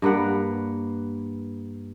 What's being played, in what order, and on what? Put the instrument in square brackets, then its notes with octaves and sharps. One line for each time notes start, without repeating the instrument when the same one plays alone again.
[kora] G2 A#3 B4 F#5